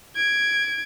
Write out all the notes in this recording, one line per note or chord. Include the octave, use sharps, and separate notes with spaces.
G#6 D7